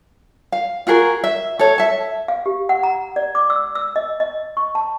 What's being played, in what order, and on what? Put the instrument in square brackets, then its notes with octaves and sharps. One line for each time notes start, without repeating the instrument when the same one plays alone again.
[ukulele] F5
F4 F#4 G#4 A#4
E5
A4 C#5
E5 A5
[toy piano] F5
G4
F#5
A#5
D5
D6
E6
E6
D#5
D#5
C#6
A5